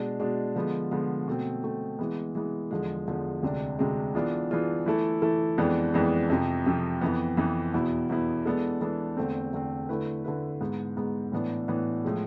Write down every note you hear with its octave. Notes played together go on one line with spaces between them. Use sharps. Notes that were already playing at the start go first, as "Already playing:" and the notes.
Already playing: B2 G#3 D4
B2 G#3 D4
D3 F3 G#3 B3
D3 F3 G#3 B3
B2 A3 C4
B2 A3 C4
E3 G#3 B3
E3 G#3 B3
E2 D3 F3 G#3
E2 D3 F3 G#3
D2 C3 G#3 D4
D2 C3 G#3 D4
E3 B3 D4 F4 G#4
E3 B3 D4 F4 G#4
E3 A3 E4 A4
E3 A3 E4 A4
F2 E3 G#3 B3 D4
F2 E3 G#3 B3 D4
F2 C3 F3
F2 C3 F3
F2 E3 B3
F2 E3 B3
E2 B2 B3 E4
E2 B2 B3 E4
E3 G#3 B3 D4 A4
E3 G#3 B3 D4 A4
E2 D3 A3 C4
E2 D3 A3 C4
D3 A3 E4 B4
D3 A3 E4 B4
G#2 G#3 B3
G#2 G#3 B3
A2 E3 B3 D4
A2 E3 B3 D4
A2 F3 G#3